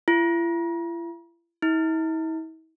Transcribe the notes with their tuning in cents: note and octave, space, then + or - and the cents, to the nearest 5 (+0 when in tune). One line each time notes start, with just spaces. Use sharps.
E4 +45
E4 -45